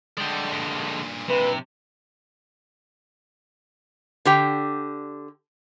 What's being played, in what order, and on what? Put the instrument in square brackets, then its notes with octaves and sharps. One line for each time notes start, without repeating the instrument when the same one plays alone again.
[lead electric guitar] D3 G#3 [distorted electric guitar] D5 G5
[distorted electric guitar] G2 A#2
[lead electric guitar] C3 [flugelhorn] B4
[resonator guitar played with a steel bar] D3 G4 G5